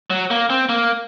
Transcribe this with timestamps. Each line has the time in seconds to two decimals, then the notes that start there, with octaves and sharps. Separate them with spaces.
0.10 F#3
0.31 A#3
0.50 C4
0.69 A#3